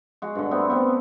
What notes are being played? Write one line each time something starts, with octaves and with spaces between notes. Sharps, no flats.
G#3 F#4
G2 D3
A3 B3 C4
B3 C4